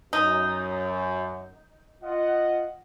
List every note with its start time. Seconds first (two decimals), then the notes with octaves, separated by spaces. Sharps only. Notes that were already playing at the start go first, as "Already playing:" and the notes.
0.13 F#2 D#4
2.03 F4 D#5 F#5